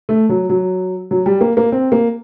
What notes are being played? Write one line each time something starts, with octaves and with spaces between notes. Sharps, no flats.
A3
F#3
F#3
F#3
G3
A#3
A#3
C4
A#3